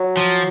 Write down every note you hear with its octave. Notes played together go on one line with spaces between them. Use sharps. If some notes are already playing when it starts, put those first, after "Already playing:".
Already playing: F#3
F3